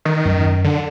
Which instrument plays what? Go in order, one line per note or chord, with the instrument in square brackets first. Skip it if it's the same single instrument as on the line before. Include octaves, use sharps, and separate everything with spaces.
[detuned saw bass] D#3
[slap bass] F#2 F#3
[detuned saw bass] D3